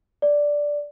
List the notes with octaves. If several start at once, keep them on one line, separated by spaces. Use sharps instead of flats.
D5